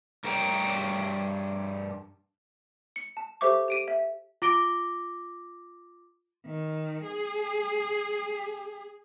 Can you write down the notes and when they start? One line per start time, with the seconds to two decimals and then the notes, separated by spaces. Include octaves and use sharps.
0.24 G2 A#4 C#5 G5 A#5
2.96 C#7
3.17 A5
3.41 G4 A4 C5 E5 C#6 D6
3.68 G4 D7 D#7
3.88 E5
4.42 F4 D6 A#6 D7 G7
6.46 D#3
7.04 G#4